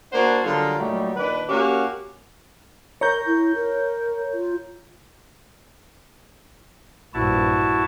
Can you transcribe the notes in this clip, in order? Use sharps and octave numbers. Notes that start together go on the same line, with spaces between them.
A#3 D4 F#4 C5 F#5 A5
D3 F#3 G3 F4 G#4 A#4
A#2 F#3 G3 A3 D#4 G4
A#2 D#3 D4 B4
A#3 C#4 F#4 G4 F5 F#5
A#4 C#5 A#5 G6
E4
A#4
F4
A#1 G2 E4 F#4 A5